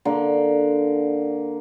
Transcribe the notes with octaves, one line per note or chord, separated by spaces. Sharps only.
D3 A#3